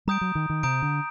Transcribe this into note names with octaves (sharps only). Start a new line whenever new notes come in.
G3 A#5 D#6 G6 D7
F#3
D#3
D#3
C3 A#5 D#6 G6 D7
D3